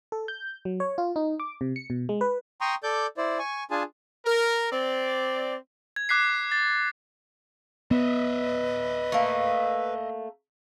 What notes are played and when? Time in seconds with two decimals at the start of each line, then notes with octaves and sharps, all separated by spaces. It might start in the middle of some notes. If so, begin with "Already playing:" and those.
0.12 A4
0.28 G6
0.65 F#3
0.80 C#5
0.98 F4
1.16 D#4
1.40 D6
1.61 C3
1.76 C#7
1.90 B2
2.09 G#3
2.21 B4
2.61 G5 A#5 C6 C#6 D#6
2.83 A4 D5 D6 G6
3.17 E4 C5 D5
3.39 G#5 C#6
3.71 D4 F4 G#4 G#5 A5
4.26 A#4
4.72 C4 D5
5.96 G#6
6.09 D6 F#6 B6 C7
6.52 A6
7.91 B3 B4 D#5 E5
9.12 A3 A#3